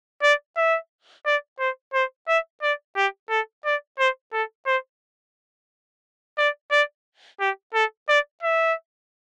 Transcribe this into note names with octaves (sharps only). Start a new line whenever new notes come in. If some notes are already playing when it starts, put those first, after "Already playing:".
D5
E5
D5
C5
C5
E5
D5
G4
A4
D5
C5
A4
C5
D5
D5
G4
A4
D5
E5